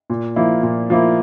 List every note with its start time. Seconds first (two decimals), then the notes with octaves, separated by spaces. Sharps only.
0.10 A#2
0.36 F3 A#3 E4
0.63 A#2
0.90 F3 A#3 E4